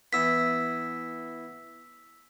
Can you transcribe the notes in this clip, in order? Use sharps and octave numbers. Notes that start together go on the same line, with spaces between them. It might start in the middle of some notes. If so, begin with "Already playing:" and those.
E3 B3 E6 B6